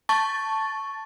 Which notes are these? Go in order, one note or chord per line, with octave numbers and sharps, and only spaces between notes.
A5 C#6 A6